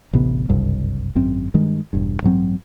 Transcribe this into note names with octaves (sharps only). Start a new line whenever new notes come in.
A1 D2 C3 B3
F#1 C2 G2
G#1 F#2 C4
G2 D#3 G#3
E1 G2
A1 G2 F#3 C4